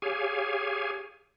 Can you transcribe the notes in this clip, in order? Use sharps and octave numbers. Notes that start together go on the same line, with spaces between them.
G4 G#4 C#5 F5 G#5